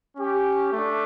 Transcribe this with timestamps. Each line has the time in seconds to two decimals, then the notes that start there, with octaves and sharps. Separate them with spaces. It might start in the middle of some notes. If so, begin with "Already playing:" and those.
0.17 C#4 G4
0.72 A3 D4